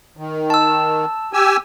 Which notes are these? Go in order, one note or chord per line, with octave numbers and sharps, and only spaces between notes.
D#3
A5 E6
G4 G#5 E6